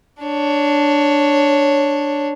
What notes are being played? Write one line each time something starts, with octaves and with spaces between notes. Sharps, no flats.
D4 C#5